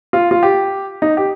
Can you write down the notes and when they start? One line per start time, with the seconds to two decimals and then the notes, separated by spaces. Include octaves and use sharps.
0.13 F4
0.31 F4
0.43 G4
1.02 D#4
1.17 G4